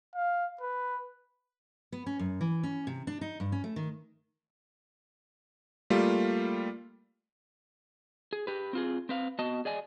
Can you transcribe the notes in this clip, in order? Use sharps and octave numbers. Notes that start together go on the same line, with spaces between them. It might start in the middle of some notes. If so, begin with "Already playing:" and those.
F5
B4
B3
C#4
F#2
E3
C#4
C3
D4
D#4
G2
C#4
A3
D#3
G3 A3 A#3 F4
G#4
G4 B4
C4 F4 G#4
C4 B4 F5
B3 F#4 D#5 A5
G#4 D5 D#5 G#5